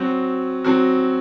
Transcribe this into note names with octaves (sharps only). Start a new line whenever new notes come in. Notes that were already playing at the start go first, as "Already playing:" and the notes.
Already playing: F#3 C4 F#4
F#3 C4 F#4